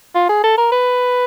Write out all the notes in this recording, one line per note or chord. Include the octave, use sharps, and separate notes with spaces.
F4
G#4
A4
A#4
B4